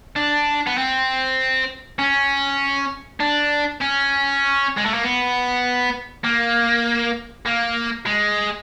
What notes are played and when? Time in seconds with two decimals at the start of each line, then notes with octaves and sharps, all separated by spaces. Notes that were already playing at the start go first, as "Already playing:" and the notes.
0.16 D4
0.67 B3
0.78 C4
1.99 C#4
3.20 D4
3.81 C#4
4.77 G#3
4.85 A3
4.94 A#3
5.03 B3
6.24 A#3
7.46 A#3
8.06 G#3